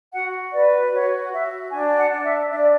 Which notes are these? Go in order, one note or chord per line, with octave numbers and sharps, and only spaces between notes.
F#4 F#5
B4 D5
F#4 C#5
F#4 E5
D4 G#5
F#5
D4
E5
D4 E5
D5